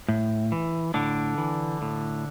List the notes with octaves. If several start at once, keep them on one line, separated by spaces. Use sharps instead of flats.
A2
E3
A2 D3 D4
E3
A2